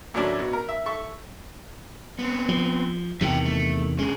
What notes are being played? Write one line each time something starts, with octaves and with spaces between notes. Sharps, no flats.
D#2 A2 F#3 A3 C#4 D4
B2
A#4
E5
A4 E5 C#6
B3 C4
F3
E2 C3 D#3 E5 F#5 G5
A3
D3 G#3 C#4